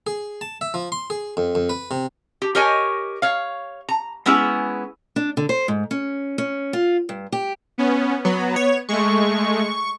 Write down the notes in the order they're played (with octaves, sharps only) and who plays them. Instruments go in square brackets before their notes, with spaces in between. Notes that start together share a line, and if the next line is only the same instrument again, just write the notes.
[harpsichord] G#4
A5
E5
F3
C6
G#4
F2
F2
B4
C3
[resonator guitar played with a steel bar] G4
G4 A#4 C#5 D#5 G#5
C#5 F5
A#5
G#3 B3 C#4 E4 G#4
[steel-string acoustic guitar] D4
D3
C5
G#2
C#4
C#4
F4
G2
G4
[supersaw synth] B3 C#4
[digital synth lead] F#3 [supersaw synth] B3
[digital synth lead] C#5
[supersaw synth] G#3 A3 [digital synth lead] C#6